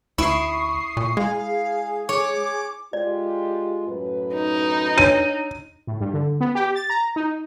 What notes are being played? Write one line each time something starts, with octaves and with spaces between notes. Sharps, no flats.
D2 E4 C#6 D#6 C7
A#2
G#3 G#4 F5
C#5 D6
G#3 F4 G4 D5
F#2 A2 B4
D#4
D4 C#5 D#7
A2
G2
D3
B3
G4
A6
A#5
D#4